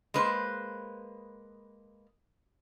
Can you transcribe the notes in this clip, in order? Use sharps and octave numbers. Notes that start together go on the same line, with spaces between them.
G#3 A#3 B4 C5